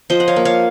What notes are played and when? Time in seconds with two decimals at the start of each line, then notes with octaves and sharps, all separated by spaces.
0.10 F3 C5 D#5
0.20 F#5
0.28 C#5 F5
0.36 A#3
0.45 C#5 F5